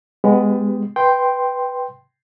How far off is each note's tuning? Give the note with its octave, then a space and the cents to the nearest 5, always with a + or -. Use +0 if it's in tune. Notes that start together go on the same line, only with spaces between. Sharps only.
G#3 -5 B3 +20 G4 +0
B4 +0 G5 +0 C6 +0